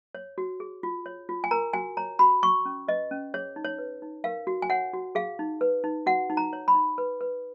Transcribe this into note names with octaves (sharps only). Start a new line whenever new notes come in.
C#5
F#4
G#4
F4
C#5
F4
G#5
A#4 A#5
F#4 G#5
C#5 A#5
F#4 B5
F#4 C#6
C#4
B4 D#5
C#4
G#4 C#5
D#4
C#5
B4
D#4
A#4 F5
F#4
G#5
C#5 F#5
F#4
G#4 F5
D#4
B4
D#4
F#4 F#5
D#4
A#5
C#5
B5
D#4
B4
B4